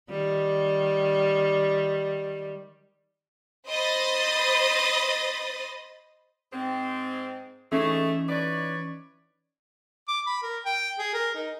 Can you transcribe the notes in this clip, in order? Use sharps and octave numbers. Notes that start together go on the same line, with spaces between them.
D#3 G3
C5 D#5 B5 D#6 A6
G#2 C4
E3 A3 C#4 D#4 G#4
B4 C#5 D5
D6
B5
A#4
G5
G#4
A#4
D#4